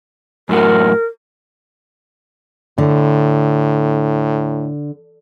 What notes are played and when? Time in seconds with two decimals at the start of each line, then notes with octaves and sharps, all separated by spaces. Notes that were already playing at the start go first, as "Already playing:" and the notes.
0.49 F#2 A2 F#4 A#4
2.78 A2 D3